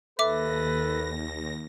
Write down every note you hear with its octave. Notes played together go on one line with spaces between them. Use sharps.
D#2 A4 B4 E5 D6 A#6